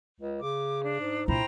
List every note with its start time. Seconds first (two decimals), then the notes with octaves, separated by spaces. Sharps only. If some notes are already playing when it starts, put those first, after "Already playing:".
0.20 C#2
0.42 C#3 D6
0.83 D4
1.00 G#2
1.28 A#2 D4 E4 C5 G5 A#5